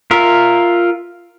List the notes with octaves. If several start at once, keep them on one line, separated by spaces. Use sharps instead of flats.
F4 A#4 E5